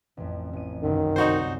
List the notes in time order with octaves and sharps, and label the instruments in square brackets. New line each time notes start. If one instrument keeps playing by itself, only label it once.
[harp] A1 F2
A1 D#7
[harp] G1 C2 F#2 [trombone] D#3
[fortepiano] D#4 F#4 C5